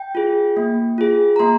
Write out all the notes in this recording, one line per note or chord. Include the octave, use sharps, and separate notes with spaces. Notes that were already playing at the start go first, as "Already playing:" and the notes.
Already playing: G5
F4 G#4
A#3
F4 G#4
A#5
A#3 C6